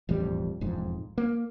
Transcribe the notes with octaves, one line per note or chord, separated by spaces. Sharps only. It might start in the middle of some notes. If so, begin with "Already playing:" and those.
E1 A1 F2 G3
E1 F2 G#2
A#3